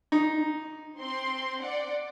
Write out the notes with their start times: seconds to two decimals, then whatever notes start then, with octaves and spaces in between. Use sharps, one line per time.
0.12 D#4
0.98 C4 C6
1.59 D5 F#5